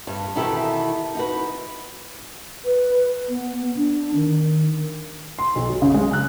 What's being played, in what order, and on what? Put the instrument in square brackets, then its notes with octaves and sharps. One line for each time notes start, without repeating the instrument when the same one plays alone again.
[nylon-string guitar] G2
B2 D#3 E3 E4 G4 A4
D#4 F#4 B4
[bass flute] B4
B3
B3
D4
D#3
[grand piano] C6
B1
F#3
C#3
G#3
F#6